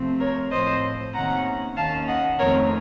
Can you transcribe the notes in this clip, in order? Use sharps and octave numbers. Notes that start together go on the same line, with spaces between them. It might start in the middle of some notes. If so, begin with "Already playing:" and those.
Already playing: C3 F3 A3 C4
A#4 C#5
A2 F3 A3 C4 C5 D#5
C3 D#3 A#3 C#4 F#5 A#5
D#2 D#3 A#3 C#4 F5 A5
D#5 F#5
F2 D#3 A3 C4 A#4 C#5